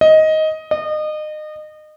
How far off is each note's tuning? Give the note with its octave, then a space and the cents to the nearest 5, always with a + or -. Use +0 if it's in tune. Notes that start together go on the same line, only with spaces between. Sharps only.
D#5 +10
D#5 -30